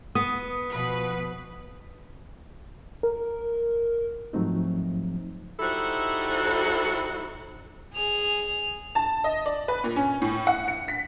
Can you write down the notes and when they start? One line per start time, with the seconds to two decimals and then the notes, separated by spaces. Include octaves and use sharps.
0.15 B3 D#6
0.72 B2 F3 B4
3.03 A#4
4.33 G#2 F3 F#3 A3 C4 D#4
5.60 G3 D#4 E4 F#4 A4 C5
7.94 G#4 F7
8.95 A5
9.24 D#5
9.46 D5
9.68 B4
9.84 A#2
9.96 C#4
10.22 A2
10.47 F#5
10.68 C#7
10.88 B6